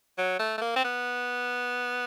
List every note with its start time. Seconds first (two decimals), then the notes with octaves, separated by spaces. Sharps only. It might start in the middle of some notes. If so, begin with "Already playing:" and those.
0.18 F#3
0.39 A3
0.58 A3
0.61 A#3
0.76 C4
0.84 B3